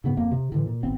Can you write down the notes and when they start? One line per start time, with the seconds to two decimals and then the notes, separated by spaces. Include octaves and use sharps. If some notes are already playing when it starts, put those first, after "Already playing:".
0.04 G#2 C#3 B3
0.17 F2 A#3
0.31 C3
0.52 A2 D3 E3
0.66 A#2
0.83 G#1 B3 C4